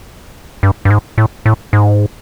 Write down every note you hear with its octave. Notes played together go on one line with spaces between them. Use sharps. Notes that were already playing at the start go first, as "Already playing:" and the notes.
G2
G2
G#2
A2
A2
G#2